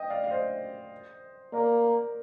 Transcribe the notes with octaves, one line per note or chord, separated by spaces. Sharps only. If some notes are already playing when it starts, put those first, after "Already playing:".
Already playing: D#5 G5
D5 F5
F5
C5 D#5
A#3 A#4 D5